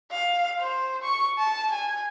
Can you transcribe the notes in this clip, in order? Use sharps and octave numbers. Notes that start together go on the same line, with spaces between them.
F5
C5
C#6
A5
G#5